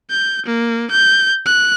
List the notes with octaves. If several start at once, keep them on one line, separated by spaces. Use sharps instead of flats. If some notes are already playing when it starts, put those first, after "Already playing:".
G6
A#3
G6
F#6